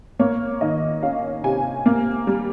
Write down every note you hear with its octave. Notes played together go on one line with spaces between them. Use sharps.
A#3 C#5
D#3 D#5
C#4 F5
C3 G#5
A#3
G3